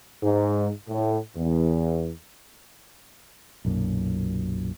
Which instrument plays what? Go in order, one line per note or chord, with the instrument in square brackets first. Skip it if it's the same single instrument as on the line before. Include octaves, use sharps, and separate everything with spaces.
[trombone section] G#2
A2
E2
[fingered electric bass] B1 F#2 A#2